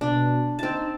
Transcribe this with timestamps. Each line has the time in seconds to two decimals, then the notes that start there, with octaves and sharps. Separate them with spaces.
0.01 B2 D4
0.59 C4 D#4 A5